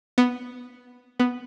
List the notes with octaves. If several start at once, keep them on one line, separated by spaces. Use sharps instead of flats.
B3
B3